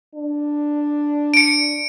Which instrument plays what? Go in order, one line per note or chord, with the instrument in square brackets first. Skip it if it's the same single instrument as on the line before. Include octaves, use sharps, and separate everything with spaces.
[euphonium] D4
[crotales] C#7 D7